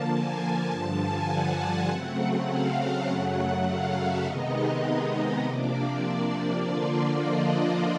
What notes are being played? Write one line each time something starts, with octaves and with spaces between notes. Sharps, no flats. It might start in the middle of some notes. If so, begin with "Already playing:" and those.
Already playing: D3 F3 A#3 A5
G#5
G2 D3 F3 A5
G#5
F#5
C#3 F#3 A3 C4
F5
F#2 C#3 F#3 A3 F#5
F5
E5
C3 D#3 G#3 B3 D#4 D#5
C3 F3 A#3 D4 D5
D5
D3 F3 A#3 D4 F4
D#5